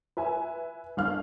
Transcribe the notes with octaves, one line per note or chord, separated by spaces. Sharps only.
B4 E5 G#5
G1 F5 F6